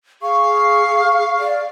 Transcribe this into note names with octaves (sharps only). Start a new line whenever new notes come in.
G#4 F5 C#6
D5